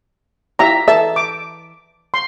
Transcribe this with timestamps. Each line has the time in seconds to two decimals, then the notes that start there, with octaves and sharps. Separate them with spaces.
0.59 F3 E4 G4 E5 A#5
0.88 E3 A4 E5 A5
1.16 D6
2.14 C6